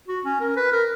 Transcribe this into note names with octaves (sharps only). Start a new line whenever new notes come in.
F#4
C#4
A#4
B4
A#4